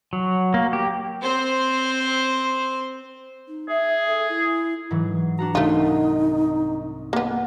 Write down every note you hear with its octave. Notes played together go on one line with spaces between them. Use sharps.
F#3
A#3
G4
C4 C5
D#4
G#4 E5
A4
E4
G#2 E3 F#3
D4 F#4 F#5 A#5
C2 A3 D#4 F4
A#3 B3